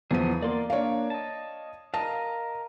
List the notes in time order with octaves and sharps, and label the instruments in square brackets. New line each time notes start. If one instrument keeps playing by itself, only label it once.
[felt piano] E2 F3 D#7 [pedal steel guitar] E3 B3 G#4
[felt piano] A#3 [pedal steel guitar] D5 C6 D6
[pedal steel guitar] A#3 D4 [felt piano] C#5 D5 F5
[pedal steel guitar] D#5 A5
[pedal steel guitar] A#4 D#5 F5 [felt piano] A5